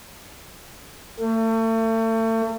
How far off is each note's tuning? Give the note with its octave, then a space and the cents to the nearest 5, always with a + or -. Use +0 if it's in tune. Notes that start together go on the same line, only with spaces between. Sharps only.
A3 +35